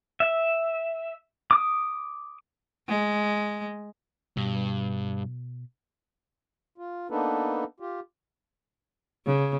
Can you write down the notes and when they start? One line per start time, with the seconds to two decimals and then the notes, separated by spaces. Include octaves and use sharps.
0.20 E5
1.51 D6 D#6
2.88 G#3
4.37 G2 B2
6.78 F4
7.11 A#3 B3 D4 D#4 A4 B4
7.80 F4 G4
9.26 C#3